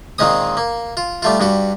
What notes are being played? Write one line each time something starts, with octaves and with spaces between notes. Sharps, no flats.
A#2 D#3 G#3 C4 D#6
A#3
F4
G3 A3 F4
G2 G3 F#4